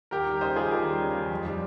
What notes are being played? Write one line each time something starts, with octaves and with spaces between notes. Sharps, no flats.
D#2 G4 A#4
G3
C#3 C5 D#5
D#2 F4 G#4
D#2 G4 A#4
G3
C#3
D#2
F2
G3